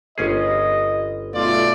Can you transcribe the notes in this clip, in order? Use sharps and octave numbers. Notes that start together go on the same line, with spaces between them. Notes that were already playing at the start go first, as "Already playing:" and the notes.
G1 C#4 G#4 D#5
B1 A3 F4 D5